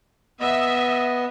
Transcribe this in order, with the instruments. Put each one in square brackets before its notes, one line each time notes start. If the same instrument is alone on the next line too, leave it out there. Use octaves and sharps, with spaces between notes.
[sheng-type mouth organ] B3 D#5 [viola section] E5